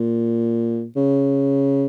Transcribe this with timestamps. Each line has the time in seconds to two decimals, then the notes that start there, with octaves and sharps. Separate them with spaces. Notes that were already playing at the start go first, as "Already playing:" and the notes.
Already playing: A#2
0.96 C#3